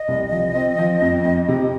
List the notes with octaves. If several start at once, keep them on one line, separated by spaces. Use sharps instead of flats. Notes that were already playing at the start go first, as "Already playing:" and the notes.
Already playing: D#5
C2
F3
C4
F3
F2
F2
C3